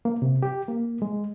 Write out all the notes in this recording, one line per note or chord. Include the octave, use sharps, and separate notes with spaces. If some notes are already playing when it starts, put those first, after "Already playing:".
A#3
C3
G4
A#3
G#3